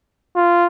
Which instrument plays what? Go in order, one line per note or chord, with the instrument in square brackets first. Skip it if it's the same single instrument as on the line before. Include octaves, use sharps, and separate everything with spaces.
[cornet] F4